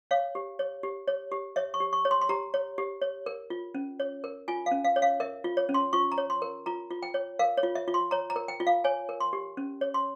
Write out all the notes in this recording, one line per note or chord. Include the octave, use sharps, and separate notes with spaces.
C#5 F5
G4
C#5
G4
C#5
G4
C#5 E5
C#6
G4
C#6
C#5
C6
C6
G4 A#5
C#5
G4
C#5
A#4
F4
C#4
C#5
A#4
F4 G#5
F5
C#4
F5
C#5
F5
A#4 E5
F4
C#5
C#4
C6
F4 C#6
A#5
C#5
C6
A#4
F4 A#5
F4
G5
C#5
A#4 F5
C#5
F4
E5
F4
C6
C#5 A#5
A#5
A#4
G5
F4
F5
C#5 G#5
A#4
C6
G4
C#4
C#5
C6